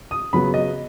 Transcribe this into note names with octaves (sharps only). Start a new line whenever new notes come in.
D#6
C#3 F#3 B3 B5
D#5